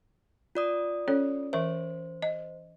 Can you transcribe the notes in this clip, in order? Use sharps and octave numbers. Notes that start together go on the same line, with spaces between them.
F4 D5 D#6
C#4 A4 C#5
E3 A#4 C5 E5
D#5